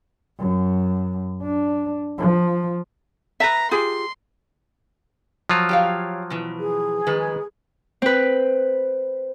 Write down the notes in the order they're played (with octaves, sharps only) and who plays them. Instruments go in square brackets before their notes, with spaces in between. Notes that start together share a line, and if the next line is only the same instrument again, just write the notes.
[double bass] F#2
D4
F3
[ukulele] B4 E5 [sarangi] A#5
[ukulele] F4 G4 G#4 [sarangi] C6
[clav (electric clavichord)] F3 F#3 F4
[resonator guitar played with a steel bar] G4 C#5 F5
B2 E3
[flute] G#4
[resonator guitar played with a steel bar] D#3 G#3 B4
[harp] C4 B4